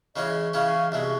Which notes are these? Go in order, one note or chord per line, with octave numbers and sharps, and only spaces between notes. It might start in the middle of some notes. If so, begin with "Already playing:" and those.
C#3 E3 G#3 C#4 D#5
C#3 E3 G#3 C#4 F5
C2 B2 G#3 E5